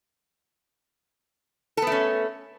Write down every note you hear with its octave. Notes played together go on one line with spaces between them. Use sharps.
A3 B3 C#4 A4